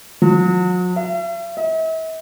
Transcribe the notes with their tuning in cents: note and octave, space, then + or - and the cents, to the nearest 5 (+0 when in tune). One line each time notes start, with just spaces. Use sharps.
F#3 -40
E5 +45
E5 -45